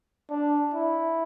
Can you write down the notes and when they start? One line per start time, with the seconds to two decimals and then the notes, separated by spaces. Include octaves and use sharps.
0.30 D4
0.74 E4